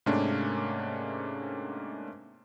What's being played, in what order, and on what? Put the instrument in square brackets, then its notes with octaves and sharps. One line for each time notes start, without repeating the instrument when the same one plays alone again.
[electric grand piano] G#2 C3 A3 A#3 C#4 D4